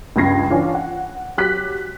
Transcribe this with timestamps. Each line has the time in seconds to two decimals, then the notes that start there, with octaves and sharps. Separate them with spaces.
0.16 C#2 G2 C#3 G#6 A#6 C7
0.50 E3 C#4 D4 F4
0.75 F#5
1.37 F#3 G4 F#6 B6